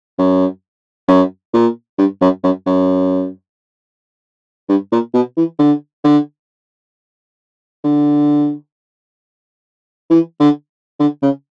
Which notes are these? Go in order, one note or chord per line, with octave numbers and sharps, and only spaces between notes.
F#2
F#2
A#2
G2
F#2
F#2
F#2
G2
A#2
B2
E3
D3
D3
D3
E3
D3
D3
C#3